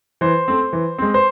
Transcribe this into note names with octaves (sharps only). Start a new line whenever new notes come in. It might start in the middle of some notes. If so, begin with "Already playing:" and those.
E3 C5
A3 C4
E3
G#3 C4
C5